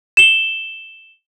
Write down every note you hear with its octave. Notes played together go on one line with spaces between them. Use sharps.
E7 G7